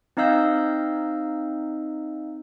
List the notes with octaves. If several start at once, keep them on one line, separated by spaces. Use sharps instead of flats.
C4 D#4 D#5 F5 E6 G6